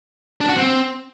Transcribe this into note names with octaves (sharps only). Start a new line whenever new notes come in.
D4
F#4
C4